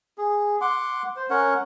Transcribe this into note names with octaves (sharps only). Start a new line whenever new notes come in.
G#4
F#5 C6 D6
C5
C#4 A#4 C#5 F#5